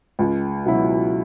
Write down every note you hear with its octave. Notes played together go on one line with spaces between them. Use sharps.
C#2
B2 F#3 E4